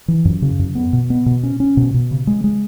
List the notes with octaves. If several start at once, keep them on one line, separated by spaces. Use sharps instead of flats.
E3
F#2
C#3
F#2
B3
B2
B3
B2
C#4
C#4
B2
B2
C#3
G#3
G#3